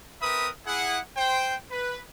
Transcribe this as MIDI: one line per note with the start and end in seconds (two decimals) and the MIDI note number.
0.21 0.49 60
0.21 0.49 70
0.21 0.49 71
0.21 0.49 76
0.21 0.49 83
0.21 0.49 87
0.66 0.99 64
0.66 0.99 68
0.66 0.99 78
1.17 1.54 72
1.17 1.54 79
1.70 2.00 71